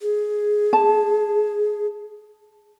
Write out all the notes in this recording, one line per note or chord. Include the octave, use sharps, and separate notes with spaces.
G#4
A5